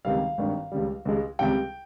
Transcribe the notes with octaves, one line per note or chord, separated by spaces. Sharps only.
C#2 C3 D#3 G3 F5
G#1 G2 D#3
C#2 C#3 G3
C#2 C#3 G#3
C#2 C3 G3 G5